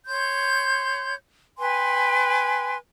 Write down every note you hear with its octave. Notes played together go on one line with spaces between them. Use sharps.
C#5 C6 G6
B4 G5 G#5 C6